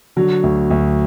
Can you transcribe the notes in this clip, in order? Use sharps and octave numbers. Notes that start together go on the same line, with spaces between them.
D3 F#3
D2
D2